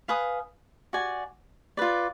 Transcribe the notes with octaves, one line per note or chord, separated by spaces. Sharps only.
B4 F5 G#5 D#6
F#4 D5 G#5
F4 B4 D5